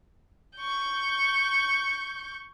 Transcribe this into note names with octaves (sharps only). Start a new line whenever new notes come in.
C#6 G6